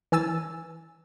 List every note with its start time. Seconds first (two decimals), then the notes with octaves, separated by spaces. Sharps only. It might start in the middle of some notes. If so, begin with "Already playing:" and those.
0.12 E3 G#5 E6 A6